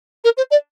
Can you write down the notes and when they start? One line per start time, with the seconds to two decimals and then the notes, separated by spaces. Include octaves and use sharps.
0.24 A#4
0.37 C5
0.51 D5